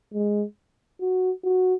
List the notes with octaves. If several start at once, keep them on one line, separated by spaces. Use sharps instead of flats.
G#3
F#4
F#4